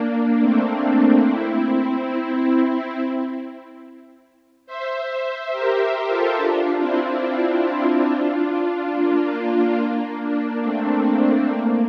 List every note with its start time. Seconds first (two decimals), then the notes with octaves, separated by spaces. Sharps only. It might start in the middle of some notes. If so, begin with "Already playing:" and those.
Already playing: A#3 D4
0.40 A3 C4
0.83 A#3 D4
1.26 C4 E4
4.66 C5 E5
5.52 G4 A#4
5.80 G4 A#4
6.09 F4 A4
6.37 D4 F4
6.80 C4 E4
7.51 D4 F4
7.79 D4 F4
8.93 A#3
9.78 A#3
10.21 A#3 D4
10.63 A3 C4
11.49 A#3